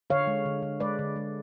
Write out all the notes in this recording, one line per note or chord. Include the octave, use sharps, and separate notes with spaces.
D3 C#5 F5
G#3
D3
D3
G#3 B4 D5
D3
G#3